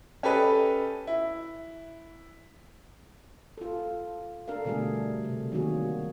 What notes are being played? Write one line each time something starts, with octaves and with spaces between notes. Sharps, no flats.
C#4 G4 A4 B4 D#5
E4
F4 A4
D4 A4 A#4 F5
B2 D3 G3 A3 G#4
C3
D#3 F#3 G3 A#3 F#4 G#4